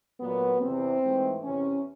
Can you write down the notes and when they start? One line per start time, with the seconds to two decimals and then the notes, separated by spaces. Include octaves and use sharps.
0.21 A#2 F#3 A3 B3
0.62 E2 C3 E3 C4
1.03 G#2 E3 A3
1.44 E2 C3 E3 C#4